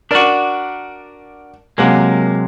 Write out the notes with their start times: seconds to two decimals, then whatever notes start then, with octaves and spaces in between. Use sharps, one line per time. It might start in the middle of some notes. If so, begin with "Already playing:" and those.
0.11 D4 F#4 A#4 D5
1.78 C3 F#3 G#3 A#3 A#4